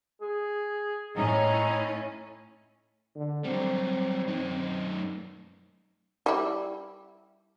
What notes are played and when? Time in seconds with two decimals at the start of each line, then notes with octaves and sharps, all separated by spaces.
0.21 G#4
1.17 A2 C#4 D#4
3.16 D3
3.45 F#3 G3 C4
4.28 F#2 D#4
6.26 G3 E4